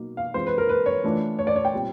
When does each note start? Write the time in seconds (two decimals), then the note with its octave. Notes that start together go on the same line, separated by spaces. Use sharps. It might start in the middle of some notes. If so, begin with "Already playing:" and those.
Already playing: B2 F#3 A#3 D#4
0.17 F5
0.34 E3 G#3 C4 F4 C5
0.47 B4
0.58 A#4
0.69 B4
0.86 C#5
1.04 E3 A3 D4 F4
1.39 C#5
1.47 D5
1.56 C#5
1.65 G5
1.73 A#2 G3 C4